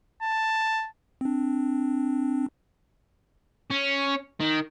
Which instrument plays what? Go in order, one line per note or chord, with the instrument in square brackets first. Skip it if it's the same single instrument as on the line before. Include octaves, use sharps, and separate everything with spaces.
[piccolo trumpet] A5
[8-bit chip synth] C4 D4
[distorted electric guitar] C#4
D#3